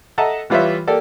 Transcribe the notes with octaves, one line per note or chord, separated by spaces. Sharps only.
A4 D#5 E5 F#5 A5 A#5
E3 G3 F4 B4 C#5 E5
A#3 G4 A4 D5